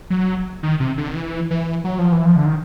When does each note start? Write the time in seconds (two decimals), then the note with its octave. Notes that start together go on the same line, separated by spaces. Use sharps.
0.10 F#3
0.63 D#3
0.80 C3
0.98 D3
1.08 D#3
1.16 E3
1.51 E3
1.84 F#3
1.99 F3
2.12 E3
2.26 F3
2.36 D3
2.46 D#3